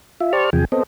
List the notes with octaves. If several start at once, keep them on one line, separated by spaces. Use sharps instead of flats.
F4 E5
G4 C5 D5 A5 C#6 F6
E2 C3 F3 G#4 G5 G#5
B3 C4 A4 C5 D#5